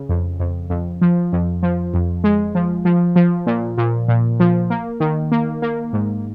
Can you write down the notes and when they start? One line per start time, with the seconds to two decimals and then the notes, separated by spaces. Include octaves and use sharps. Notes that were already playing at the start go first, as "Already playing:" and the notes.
Already playing: C#3
0.09 F2
0.40 F2
0.70 F2
1.01 F3
1.32 F2
1.63 F3
1.94 F2
2.24 G#3
2.55 F3
2.85 F3
3.16 F3
3.47 A#2
3.78 A#2
4.08 A#2
4.40 F3
4.70 A#3
5.00 D#3
5.32 A#3
5.62 A#3
5.93 G#2